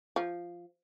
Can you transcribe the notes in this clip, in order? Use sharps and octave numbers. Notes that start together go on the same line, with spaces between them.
F3